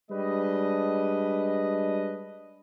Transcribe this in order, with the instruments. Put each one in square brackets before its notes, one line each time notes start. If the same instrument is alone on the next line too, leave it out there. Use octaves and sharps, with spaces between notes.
[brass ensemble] G3 G#3 D4 B4 D#5